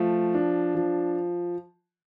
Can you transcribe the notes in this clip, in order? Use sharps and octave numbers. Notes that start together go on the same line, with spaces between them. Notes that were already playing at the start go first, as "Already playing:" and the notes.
Already playing: F3 A3
D4
F3